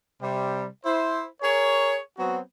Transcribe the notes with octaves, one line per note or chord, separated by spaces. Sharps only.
C3 G3
E4 C5
G#4 A#4 C#5
F#3 B3 C4 F#4